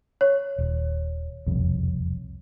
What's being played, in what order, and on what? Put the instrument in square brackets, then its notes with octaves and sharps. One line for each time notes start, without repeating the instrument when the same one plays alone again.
[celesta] C#5
[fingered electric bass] D#1
E1 C2 F2